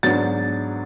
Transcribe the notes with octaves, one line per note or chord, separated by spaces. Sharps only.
G#2 F#3 B3 D4 A6